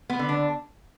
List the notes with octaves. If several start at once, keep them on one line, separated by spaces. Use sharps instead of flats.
B3
D3
D4